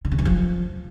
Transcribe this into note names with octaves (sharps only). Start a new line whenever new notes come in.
D3
C#3
E3
F3